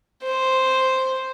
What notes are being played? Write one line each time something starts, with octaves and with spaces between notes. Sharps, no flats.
C5